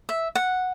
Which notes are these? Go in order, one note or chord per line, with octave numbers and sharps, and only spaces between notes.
E5
F#5